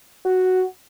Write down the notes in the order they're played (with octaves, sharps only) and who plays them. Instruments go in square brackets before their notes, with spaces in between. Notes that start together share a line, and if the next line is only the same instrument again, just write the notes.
[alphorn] F#4